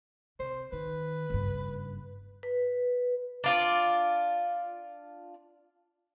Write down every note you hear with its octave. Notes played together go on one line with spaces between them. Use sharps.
C3 C5
D#3 B4
F#1 G2
B4
D4 F4 D5